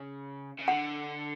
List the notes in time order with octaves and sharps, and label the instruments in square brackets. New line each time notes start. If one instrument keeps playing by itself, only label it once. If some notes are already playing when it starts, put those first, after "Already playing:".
Already playing: [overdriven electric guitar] C#3
C#3
[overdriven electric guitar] D3 [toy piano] F#5